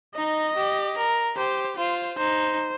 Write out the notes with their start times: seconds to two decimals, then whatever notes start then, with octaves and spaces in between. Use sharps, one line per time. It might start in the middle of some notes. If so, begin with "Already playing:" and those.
0.15 D#4 D#5
0.56 G4
0.97 A#4
1.37 G4 C5
1.77 F4 C5
2.18 D#4 C5